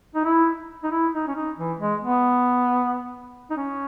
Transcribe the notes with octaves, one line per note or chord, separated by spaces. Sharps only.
D#4
E4
D#4
E4
D#4
C#4
D#4
E3
G#3
B3
D#4
C#4